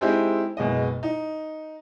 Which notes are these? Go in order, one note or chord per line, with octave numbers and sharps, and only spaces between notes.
G#3 C4 D#4 E4 G4
F#1 B2 G#3 D#5
D#4